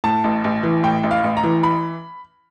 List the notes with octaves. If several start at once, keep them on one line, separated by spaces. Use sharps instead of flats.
A2 A5
A1
A1
E3
A2 G5
A1
F5
A1
A#5
E3
B5